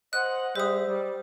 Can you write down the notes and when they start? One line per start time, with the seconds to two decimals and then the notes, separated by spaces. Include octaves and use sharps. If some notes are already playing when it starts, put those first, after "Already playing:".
0.13 C5 D#5 F#5 F#6
0.55 G3 G#3 C5 E5 D#6
0.88 G3